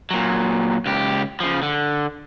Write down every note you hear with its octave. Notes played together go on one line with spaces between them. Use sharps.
A#2 F#3
C#2 G4
C#3 F3
D3